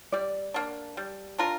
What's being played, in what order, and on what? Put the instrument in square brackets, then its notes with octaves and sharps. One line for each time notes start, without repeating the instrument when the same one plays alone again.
[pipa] G3 [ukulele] D5
[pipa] A#3 D4
G3
D4 F4 A#4